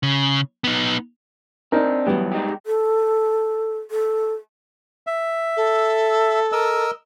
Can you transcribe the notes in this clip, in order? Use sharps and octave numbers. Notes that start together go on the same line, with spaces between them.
C#3
B3 D#4
C4 D4 D#4 A#4
E3 F#3 G3 B3
G#3 D#4 G4
A4
A4
E5
A4
A#4 D#5 E6